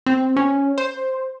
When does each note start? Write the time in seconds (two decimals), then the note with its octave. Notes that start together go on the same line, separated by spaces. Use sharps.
0.06 C4
0.36 C#4
0.78 C5